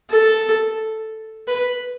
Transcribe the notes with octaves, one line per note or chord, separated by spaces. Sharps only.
A4
B4